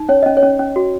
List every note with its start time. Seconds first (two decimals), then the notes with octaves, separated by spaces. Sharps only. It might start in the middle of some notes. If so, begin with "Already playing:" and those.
Already playing: D#4
0.09 C#4 C#5
0.23 C#4 D#5
0.37 C#5
0.43 C#4
0.59 C#4
0.76 F#4